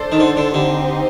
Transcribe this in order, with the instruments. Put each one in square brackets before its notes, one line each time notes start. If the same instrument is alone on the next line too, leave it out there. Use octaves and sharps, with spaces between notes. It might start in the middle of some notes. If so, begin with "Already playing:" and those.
Already playing: [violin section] D4 A4 C5
[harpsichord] D#3
D3
D3
[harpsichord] D3 [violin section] C4 D#4 G4 C5